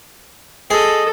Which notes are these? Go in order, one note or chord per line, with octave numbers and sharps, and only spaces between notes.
G#4 A4 D#5